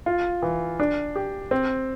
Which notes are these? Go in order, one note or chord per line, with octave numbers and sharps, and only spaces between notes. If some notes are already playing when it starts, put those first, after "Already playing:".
F4
E3
D4
G4
C4